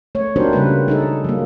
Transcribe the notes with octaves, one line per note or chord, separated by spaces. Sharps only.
A3 C#5
D4 D#4 F#4 G4 A#4 C5
C#3 G3 A#3 B4
D#4 G#4 A4
F#3 G3 A#3